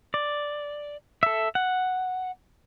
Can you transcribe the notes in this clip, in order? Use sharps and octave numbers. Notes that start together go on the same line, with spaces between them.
D5
A4 E5
F#5